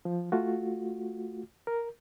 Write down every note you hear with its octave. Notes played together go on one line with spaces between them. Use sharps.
F3
A3 F4 F#4
A#4